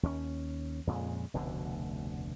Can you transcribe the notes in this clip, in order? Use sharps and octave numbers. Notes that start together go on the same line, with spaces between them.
D#2 C#4
F2 A#2 C#3 G#3
F1 D2 B2 D3